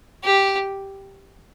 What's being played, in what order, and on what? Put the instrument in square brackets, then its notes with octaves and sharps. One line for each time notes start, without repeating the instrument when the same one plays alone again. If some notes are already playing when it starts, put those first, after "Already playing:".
[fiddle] G4